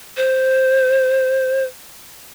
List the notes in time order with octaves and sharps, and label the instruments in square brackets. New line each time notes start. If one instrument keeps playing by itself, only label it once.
[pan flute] C5